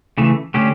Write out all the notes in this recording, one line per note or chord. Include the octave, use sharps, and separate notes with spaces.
C#3 E3 A3
D3 A3 C#4 G4